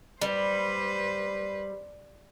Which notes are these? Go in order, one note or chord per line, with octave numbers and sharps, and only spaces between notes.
G3 B4 C5